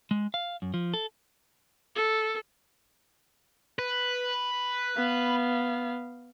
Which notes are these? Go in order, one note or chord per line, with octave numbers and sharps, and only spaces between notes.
G#3
F5
F#2
F3
A4
A4
B4
B3 F5